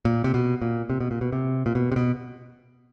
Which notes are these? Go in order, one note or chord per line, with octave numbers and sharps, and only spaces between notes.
A#2
C3
B2
A#2
C3
B2
A#2
B2
C3
A#2
B2
C3
B2